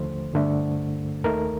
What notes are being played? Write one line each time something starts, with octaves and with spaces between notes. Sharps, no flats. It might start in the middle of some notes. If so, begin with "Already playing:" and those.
Already playing: D#2 D3 F3 A3 C5
G2 D3 A3
D#2 D#3 A3 A#4